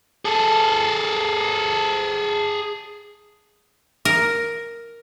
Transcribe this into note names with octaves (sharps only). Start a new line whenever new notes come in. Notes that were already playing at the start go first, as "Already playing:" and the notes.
G#4 A4
A#4